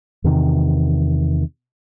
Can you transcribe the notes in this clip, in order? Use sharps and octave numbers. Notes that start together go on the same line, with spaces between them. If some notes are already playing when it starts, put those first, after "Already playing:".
E2 C3 D#3